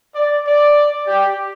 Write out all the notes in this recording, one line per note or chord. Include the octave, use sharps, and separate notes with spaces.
D5
D5
G4